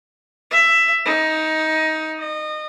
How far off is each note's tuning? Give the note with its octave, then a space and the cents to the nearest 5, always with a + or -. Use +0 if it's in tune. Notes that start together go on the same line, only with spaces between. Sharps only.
E5 +10
D#4 +15
D#5 -25